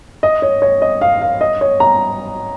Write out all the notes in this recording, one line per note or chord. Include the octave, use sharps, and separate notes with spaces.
D#5
C#5
C#5
D#5
F5
F5
D#5
C#5
A#5